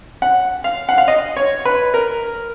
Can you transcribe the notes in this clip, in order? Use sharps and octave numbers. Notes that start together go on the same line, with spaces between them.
F#5
F5
F#5
F5
D#5
C#5
B4
A#4